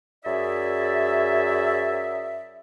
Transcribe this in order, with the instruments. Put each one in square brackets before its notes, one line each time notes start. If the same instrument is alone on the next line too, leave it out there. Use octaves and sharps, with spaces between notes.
[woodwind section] F#2 G#4 D5 E5